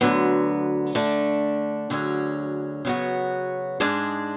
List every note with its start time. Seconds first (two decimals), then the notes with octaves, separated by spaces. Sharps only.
0.01 D2 D3 F#3 B3
0.95 D3 A3 D4
1.90 D2 D3 F#3 C#4 G#4
2.85 C#3 F#3 B3 F#4
3.80 G#2 G#3 D4 G#4